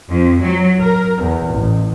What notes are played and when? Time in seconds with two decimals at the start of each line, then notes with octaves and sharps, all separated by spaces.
0.11 F2
0.43 F#3
0.81 A#4
1.22 E2
1.53 A1